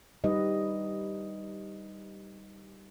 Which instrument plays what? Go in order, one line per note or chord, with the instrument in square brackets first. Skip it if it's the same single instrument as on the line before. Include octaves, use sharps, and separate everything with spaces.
[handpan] G3 D#4 G4 B4 D#5